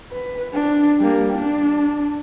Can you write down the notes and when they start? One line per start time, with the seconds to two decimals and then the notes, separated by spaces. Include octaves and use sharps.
0.12 B4
0.54 D4
0.99 G3 A#3
1.33 D4